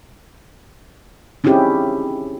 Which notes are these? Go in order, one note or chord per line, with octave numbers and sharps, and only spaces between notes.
C4 C#4 D#4 E4 G4 G#4